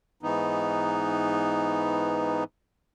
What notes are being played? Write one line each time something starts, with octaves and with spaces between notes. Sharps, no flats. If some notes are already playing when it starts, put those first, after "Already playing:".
G#2 E3 B3 D#4